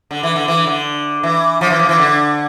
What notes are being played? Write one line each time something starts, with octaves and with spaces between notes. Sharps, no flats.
D3
E3
D3
E3
D3
E3
F3
E3
F3
E3
D3